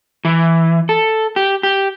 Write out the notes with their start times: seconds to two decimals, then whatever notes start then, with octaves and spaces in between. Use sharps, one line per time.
0.25 E3
0.89 A4
1.36 G4
1.63 G4